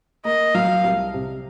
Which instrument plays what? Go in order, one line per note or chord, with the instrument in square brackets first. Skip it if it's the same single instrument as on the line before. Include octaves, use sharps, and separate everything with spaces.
[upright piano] A#3 [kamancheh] D#5
[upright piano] F#3 [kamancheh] F5
[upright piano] C2
C3